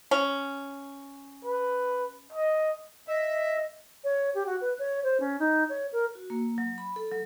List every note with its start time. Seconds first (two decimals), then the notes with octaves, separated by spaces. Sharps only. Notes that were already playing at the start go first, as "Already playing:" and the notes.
0.11 C#4
1.45 B4
2.32 D#5
3.08 D#5 E5
4.04 C#5
4.35 G4
4.46 F#4
4.61 B4
4.79 C#5
5.04 C5
5.20 C#4
5.39 D#4
5.69 C#5
5.92 A#4
6.15 F#4
6.30 A#3
6.58 F#3
6.78 B5
6.96 A4
7.12 F#3